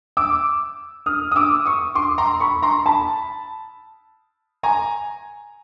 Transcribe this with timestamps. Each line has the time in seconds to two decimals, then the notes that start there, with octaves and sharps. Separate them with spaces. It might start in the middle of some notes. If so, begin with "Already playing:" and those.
0.17 D6 E6
1.06 D#6 F6
1.31 D#6
1.36 D6 E6
1.65 C#6 D#6
1.95 C6 D6
2.18 A#5 C6
2.40 B5 C#6
2.63 A#5 C6
2.86 A5 B5
4.63 G#5 A#5